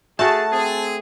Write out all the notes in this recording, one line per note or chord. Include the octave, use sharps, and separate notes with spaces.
A3 F#4 G#4 A5
C4 G#4